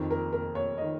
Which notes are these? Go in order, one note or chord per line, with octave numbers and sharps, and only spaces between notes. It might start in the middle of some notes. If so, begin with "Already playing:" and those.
Already playing: F2 D#3
A#4
A#4
C#5
D#3 D#5